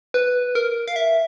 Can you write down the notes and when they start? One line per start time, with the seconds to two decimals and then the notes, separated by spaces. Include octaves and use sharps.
0.14 B4
0.55 A#4
0.88 F5
0.96 E5